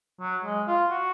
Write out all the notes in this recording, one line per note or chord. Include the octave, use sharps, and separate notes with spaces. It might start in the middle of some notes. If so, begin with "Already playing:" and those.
F#3
G#3
F4
F#4